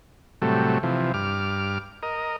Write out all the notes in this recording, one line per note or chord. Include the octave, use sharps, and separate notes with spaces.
A2 C3 F#3 G3 A3
C3 E3 F3
G2 D6 F6
A#4 D#5